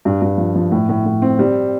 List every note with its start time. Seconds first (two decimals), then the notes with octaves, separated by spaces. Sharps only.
0.05 G2
0.22 G2
0.38 F3
0.55 F3
0.72 A2
0.89 A2
1.05 A2
1.22 C4
1.39 G3